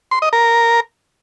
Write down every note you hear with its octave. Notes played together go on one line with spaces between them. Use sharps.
C6
D#5
A#4